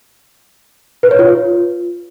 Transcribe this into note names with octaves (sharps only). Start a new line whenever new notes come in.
B4
C#5
F4